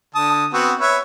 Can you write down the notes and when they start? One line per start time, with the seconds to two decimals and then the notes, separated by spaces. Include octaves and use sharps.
0.15 D3 A5 D#6
0.53 B3 C4 F#4
0.81 B4 C#5 E5